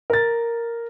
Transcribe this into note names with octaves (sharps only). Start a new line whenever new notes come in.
A#4 A6